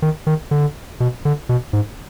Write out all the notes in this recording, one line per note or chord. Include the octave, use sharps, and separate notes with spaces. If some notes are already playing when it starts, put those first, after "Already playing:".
D#3
D#3
D3
B2
D3
B2
G#2